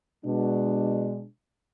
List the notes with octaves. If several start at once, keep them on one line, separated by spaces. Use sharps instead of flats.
B2 G#3 D4